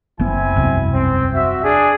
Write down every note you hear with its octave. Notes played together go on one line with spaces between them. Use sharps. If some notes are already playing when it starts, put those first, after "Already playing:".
F#1 B3 C4 E4 G#5
E1 C2 F#2
C4
F#4 E5
D4 G#4